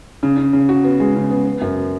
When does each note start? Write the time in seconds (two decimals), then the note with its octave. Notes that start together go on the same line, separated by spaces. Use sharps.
0.23 C#3
0.37 C#3
0.53 C#3
0.69 F#4
0.84 B3
1.00 G#3
1.15 C#3
1.30 B3
1.45 B3
1.61 F#2